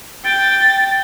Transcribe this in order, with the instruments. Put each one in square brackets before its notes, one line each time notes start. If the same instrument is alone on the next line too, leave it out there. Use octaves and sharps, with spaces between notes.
[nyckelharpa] G5 [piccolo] A6